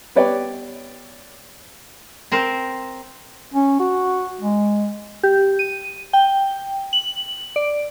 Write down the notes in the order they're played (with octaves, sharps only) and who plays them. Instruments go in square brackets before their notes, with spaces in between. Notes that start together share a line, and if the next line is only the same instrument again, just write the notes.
[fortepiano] G3 B3 B4 C#5 D5 G5
[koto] C4 A#4 C5
[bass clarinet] C#4
F#4
G#3
[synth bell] G4
D#7
G5
F#7
D5